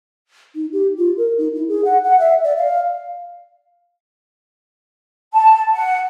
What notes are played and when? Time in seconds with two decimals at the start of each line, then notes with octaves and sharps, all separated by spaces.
0.55 D#4
0.73 G4
0.97 F4
1.17 A#4
1.38 D#4
1.55 E4
1.68 G#4
1.85 F#5
2.04 F#5
2.20 E5
2.44 D5
2.57 F5
5.33 A5
5.73 F#5